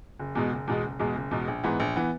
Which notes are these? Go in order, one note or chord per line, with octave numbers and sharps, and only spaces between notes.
F#1
E2 B2 G#3
F#1
E2 B2 G#3
F#1
E2 B2 G#3
F#1
E2 B2 G#3
A#1
G#2 E3 B3
A#1
E3 B3